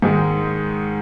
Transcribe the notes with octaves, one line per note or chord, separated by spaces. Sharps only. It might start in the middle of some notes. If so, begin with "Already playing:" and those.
G#2 D#3 G#3